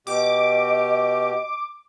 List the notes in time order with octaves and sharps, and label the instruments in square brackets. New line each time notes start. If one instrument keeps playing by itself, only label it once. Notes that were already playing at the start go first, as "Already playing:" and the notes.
[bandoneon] B2 G4 [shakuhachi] D#5 [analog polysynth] D6